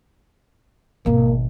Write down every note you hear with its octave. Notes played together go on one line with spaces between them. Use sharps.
G#1 B2 A#3